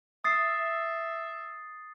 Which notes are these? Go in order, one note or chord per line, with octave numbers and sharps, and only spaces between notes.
E5 D#6 A6 C7